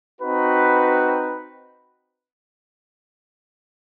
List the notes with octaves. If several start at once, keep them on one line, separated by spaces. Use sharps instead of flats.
C4 D#4 F#4 B4